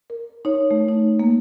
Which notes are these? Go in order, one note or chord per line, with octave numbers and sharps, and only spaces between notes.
A#4
D#4 C#5
A3
D#4
A#3